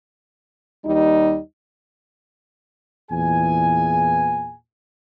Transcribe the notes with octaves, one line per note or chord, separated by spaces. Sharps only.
D#2 G3 D#4
E2 A#2 E3 G#4 G#5